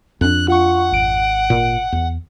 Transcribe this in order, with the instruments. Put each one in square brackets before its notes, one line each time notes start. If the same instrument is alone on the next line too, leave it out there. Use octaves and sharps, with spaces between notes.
[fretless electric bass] F2 D4 [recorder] F#6
[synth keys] F4 C#6 [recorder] F#5
[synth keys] G#1 D7
[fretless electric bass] A#2
E2